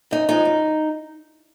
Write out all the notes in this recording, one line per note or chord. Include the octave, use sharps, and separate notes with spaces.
F#2 D#4
F3 G#3 D#4
F#2